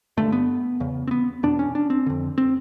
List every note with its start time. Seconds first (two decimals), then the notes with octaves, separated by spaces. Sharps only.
0.17 G2 D3 A3
0.32 B3
0.80 E2 C#3
1.08 C4
1.11 B3
1.43 E2 B2 D4
1.59 C#4
1.75 D4
1.90 C4
2.06 F2 D3
2.38 C4